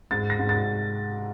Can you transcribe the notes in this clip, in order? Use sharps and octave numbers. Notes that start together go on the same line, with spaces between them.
G#2 A6
A#6
G#2
A6